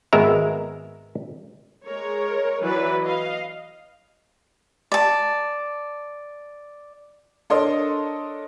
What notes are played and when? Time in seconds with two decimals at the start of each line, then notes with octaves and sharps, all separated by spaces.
0.13 G#1 G#3 B3 A#4 E5 A#5
1.85 G#3 A#4 C#5
2.61 E3 F#3 B4 D5
3.02 D#5 F5
4.92 D5 A5
7.50 D4 A4 A#4 C#5 D#5 C6